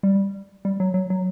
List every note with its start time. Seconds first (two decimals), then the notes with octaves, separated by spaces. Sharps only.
0.03 G3
0.65 G3
0.80 F#3
0.94 F#3
1.10 F#3